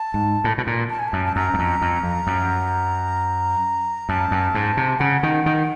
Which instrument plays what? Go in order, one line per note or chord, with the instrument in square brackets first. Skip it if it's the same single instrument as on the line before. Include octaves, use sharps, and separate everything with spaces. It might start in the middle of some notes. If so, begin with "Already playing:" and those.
Already playing: [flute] A5
[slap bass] G#2
A2
B2
A#2
[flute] A5
G#5
[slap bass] F#2 [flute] A5
[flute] A5
[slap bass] F#2 [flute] A#5
[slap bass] F#2
F2
F2
F2
F#2
[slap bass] F#2 [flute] A5
[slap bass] F#2
G#2
C3
[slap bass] C#3 [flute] F#5
[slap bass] D#3
D#3